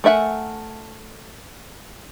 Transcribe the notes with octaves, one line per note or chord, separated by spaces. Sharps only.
A3 A#4 E5 F#5 G#5